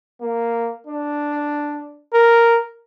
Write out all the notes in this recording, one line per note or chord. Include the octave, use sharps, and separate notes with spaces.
A#3
D4
A#4